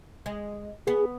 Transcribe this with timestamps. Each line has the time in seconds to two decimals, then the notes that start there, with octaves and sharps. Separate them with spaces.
0.26 G#3
0.87 B3 G#4